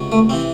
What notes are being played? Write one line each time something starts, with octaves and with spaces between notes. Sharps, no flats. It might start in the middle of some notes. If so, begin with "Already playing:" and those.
Already playing: C#2 C3 F#3
A3
C3 E3 C4